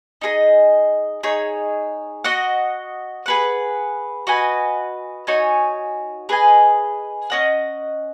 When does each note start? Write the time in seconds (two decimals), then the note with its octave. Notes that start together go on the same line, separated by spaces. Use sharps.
0.22 D#4 G#4 B4 D#5
1.23 D#4 G#4 C#5
2.24 F#4 D#5 F#5
3.26 G#4 B4 F#5
4.27 F#4 B4 D#5 G#5
5.27 D#4 F#4 C#5 G#5
6.29 G#4 B4 D#5 G#5
7.30 C#4 B4 D#5 F#5